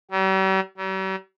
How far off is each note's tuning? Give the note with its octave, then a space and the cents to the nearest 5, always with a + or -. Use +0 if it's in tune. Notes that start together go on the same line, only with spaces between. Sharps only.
G3 -45
G3 -45